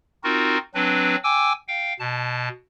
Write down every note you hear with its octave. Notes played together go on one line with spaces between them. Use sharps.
C4 D#4 F4 F#4 A#4
F#3 C4 D4 B4
G5 G#5 D6 E6
F5 G5
B2 A5